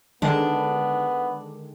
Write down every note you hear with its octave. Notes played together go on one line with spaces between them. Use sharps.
D3 D#3 G#3 B3 D4